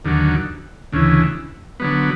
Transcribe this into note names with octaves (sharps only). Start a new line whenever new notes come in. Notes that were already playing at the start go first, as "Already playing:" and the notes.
D#2 D3 F#3
D2 C#3 E3
D3 F#3 B3